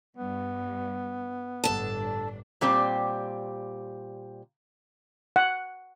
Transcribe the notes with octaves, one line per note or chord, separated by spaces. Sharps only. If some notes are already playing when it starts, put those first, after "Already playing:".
G2 B3
G1 A2 D4 A4 A5
A#2 G3 C4 G4
F#5